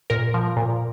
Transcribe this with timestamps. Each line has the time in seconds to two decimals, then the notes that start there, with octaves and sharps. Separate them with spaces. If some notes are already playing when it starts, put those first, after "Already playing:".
0.10 A#2 A#4
0.34 F3
0.57 A#2